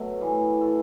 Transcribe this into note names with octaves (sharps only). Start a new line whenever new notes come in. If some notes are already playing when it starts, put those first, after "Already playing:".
Already playing: B2 F#3 A3
A2 E3
A2 E3 A3